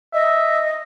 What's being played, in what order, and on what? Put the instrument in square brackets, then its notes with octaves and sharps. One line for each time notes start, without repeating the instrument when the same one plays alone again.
[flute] D#5 [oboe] E5